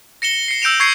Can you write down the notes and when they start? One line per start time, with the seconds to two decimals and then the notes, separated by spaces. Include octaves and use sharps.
0.22 A#6 C#7 E7 G7
0.48 C7 C#7
0.62 E6 G6 D7 E7 F7
0.80 C#6 G#6 C7 C#7